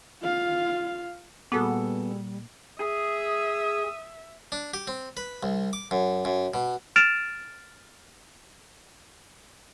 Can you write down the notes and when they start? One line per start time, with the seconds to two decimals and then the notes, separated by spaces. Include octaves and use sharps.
0.22 F4 F5
1.52 A#2 G3 A#3 B3 F#4 G#4 A4
2.80 G#4 E5 D#6
4.52 D4
4.74 G4
4.87 C4
5.17 B4
5.43 C2
5.73 D6
5.91 F#2
6.25 F#2
6.54 B2
6.96 F6 A6 D7 E7 F7